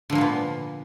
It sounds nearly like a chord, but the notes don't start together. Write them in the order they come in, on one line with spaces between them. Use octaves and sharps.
D3 F3 A#3 A#2 B3